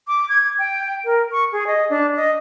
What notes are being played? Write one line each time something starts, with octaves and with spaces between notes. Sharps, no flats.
D6
G#6
G5
A#4
C#6
G#4
D#5
D4
D#5